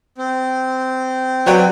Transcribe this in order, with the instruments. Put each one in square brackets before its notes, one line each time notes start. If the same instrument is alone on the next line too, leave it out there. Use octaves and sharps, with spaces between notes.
[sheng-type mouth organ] C4
[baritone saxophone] F#3 [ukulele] B4 D5 G5